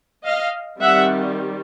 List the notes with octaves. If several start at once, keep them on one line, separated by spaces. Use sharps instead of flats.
D#5 F5
D#3 G3 C4 E5 F#5